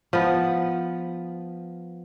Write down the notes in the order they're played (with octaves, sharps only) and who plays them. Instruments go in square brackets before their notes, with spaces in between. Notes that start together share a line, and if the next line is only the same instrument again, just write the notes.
[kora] F3 B3